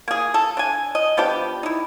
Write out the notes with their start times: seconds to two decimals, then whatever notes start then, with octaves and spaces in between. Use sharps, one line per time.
0.08 A#3 G#4
0.34 A4
0.57 D4 G#5
0.95 D#5
1.17 F3 B3 D4 G4
1.63 D#4 E4